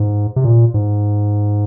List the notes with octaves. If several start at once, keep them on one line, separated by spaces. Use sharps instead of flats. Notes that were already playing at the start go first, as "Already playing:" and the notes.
Already playing: G#2
C3
A#2
G#2